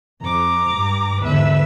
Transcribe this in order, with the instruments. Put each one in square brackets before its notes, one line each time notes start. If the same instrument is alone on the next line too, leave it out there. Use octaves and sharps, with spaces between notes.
[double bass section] F2 [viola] A#5 D6
[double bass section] G2
[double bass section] E2 G#2 D3 [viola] B4 E5